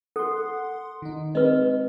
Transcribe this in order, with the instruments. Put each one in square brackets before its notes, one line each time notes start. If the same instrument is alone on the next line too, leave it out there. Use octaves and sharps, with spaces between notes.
[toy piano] A4 [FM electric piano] F#5 C6
[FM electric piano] D#3 D#4
[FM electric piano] G#3 C4 [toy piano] B4 D#5